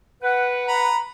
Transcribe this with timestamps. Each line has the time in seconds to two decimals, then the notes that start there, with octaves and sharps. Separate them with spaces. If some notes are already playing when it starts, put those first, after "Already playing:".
0.23 B4 F#5
0.68 A#5 B5